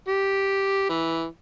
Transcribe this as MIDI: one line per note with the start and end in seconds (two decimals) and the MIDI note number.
0.08 0.85 67
0.89 1.25 52